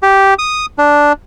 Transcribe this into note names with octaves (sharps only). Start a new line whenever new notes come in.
G4
D#6
D4